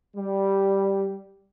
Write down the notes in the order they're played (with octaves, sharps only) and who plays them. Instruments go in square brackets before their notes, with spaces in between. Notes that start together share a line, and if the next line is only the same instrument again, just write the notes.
[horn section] G3